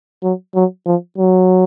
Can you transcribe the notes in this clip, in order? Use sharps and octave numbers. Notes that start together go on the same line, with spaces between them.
F#3
F#3
F3
F#3